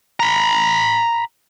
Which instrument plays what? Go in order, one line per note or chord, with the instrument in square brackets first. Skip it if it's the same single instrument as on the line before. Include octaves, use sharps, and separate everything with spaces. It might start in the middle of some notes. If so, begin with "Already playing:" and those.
[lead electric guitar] A#5 B5